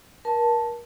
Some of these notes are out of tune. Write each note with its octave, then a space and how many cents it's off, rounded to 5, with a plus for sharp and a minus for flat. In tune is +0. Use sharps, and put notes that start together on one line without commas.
A#4 +30 A5 +0